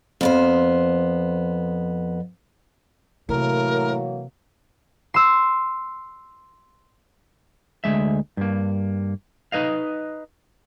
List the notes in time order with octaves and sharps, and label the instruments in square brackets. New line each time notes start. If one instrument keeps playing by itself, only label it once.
[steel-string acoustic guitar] F2 B3 C5
[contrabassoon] A2 [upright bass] C3 [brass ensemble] E3 F#3 A#3 [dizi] A#4
[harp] C6 E6
[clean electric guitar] D2 G2 G#3 E5
G2 A#3
D#4 B4 D#5 F5